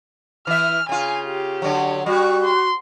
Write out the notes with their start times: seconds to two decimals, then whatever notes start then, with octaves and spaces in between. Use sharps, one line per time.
0.47 E3 E5 F6
0.89 C#3 F4 G#5
1.27 G4
1.62 D3 F#3 C#5
2.06 G3 F#4 C#6
2.44 C6